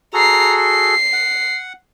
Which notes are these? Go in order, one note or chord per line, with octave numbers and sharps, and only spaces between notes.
F#4 G#4 A4 A#5 C7
C7
F#5